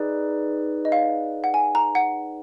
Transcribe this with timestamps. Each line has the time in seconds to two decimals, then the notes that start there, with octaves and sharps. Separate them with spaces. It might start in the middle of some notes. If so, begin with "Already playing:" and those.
Already playing: D#4 G#4 B4 D5
0.85 D#5
0.92 F5
1.44 F#5
1.54 G#5
1.75 A#5
1.95 F#5